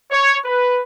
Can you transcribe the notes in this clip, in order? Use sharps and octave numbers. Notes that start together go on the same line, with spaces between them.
C#5
B4